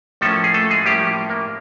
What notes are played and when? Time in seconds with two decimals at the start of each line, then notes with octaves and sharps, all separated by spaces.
0.21 A2 F3 A3 A#3 C#4 A4
0.44 G#4
0.54 A3 A4
0.70 G#3 G#4
0.85 A2 F3 G3 A#3 C#4 G4
1.29 A#3 A#4